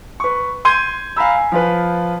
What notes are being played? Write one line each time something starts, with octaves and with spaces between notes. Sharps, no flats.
B4 C#6
C6 G6 G#6 D#7
F5 G#5 A#5 B5 E6
G#5
F3 F4 B4